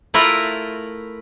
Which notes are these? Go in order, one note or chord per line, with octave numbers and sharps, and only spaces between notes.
A3 E4 F4 A#4